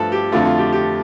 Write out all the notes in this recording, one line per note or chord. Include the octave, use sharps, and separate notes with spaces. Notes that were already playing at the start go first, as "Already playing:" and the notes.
Already playing: G2 F3 A3 A4 B4
G4
F2 D3 A3 F4
F4
G4
G4